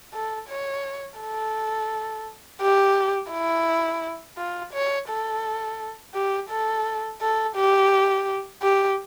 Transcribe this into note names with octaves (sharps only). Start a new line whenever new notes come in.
A4
C#5
A4
G4
E4
F4
C#5
A4
G4
A4
A4
G4
G4